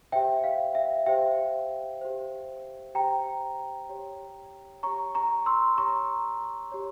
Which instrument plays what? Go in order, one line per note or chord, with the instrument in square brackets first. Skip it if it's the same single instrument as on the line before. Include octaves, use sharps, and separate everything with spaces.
[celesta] G4 C5 E5 G5
F5
E5
G4 C5 E5 G5
G4 C5
G4 C5 G5 A#5
G4 C#5
G4 C#5 A#5 C#6
A#5 C#6
C6 E6
G4 C#5 A#5 C#6
G4 C#5